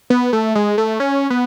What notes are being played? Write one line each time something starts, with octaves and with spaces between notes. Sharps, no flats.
B3
A3
G#3
A3
C#4
B3